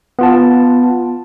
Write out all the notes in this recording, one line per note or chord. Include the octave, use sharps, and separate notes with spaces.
B3 F4 A5